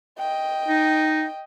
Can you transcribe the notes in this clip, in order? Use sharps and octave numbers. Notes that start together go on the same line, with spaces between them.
D#5 G5
D#4